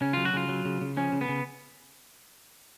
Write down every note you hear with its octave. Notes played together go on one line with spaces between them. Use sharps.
C#3 C#4
F#3 F4
F#4
C#3 F4
F#3
C#3
C#3
F3 C#4
C#3
B3
C#3